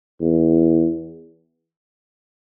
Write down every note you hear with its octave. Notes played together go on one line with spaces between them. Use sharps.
E2